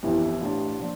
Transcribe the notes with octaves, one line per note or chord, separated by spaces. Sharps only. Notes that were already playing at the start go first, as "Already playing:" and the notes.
G1 F2 E3 G3 E4
E4
A1 A2 G3 D4 F4
A#2 F3